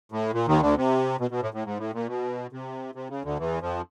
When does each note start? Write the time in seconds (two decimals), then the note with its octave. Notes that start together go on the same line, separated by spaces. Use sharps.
0.12 A2
0.33 A#2
0.48 D#2 D#3
0.62 D2 D3
0.77 C3
1.20 B2
1.31 B2
1.42 A2
1.54 A2
1.65 G#2
1.78 A2
1.94 A#2
2.08 B2
2.52 C3
2.95 C3
3.10 C#3
3.24 D2 D3
3.39 E2 E3
3.62 F2 F3